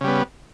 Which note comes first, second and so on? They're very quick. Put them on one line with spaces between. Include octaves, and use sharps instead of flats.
C#3 G3 B3